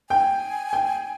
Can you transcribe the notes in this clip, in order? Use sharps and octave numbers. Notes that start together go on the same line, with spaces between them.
G5 G#5
G5